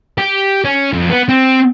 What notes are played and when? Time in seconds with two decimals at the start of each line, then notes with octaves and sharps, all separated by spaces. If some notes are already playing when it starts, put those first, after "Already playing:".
0.18 G4
0.65 C#4
0.93 F2
1.10 B3
1.29 C4